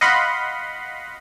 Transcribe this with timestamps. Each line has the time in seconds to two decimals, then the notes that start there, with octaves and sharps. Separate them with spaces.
0.01 D#5 F5 F#5 B5 C6